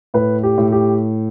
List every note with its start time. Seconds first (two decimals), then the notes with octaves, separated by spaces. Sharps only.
0.14 A2 B4
0.43 G4
0.58 A2
0.72 G4